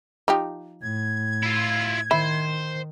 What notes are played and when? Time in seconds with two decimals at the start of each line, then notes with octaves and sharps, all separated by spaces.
0.28 F3 D#4 G4
0.82 A2 G#6
1.43 E4 F4
2.11 D#3 E4 C5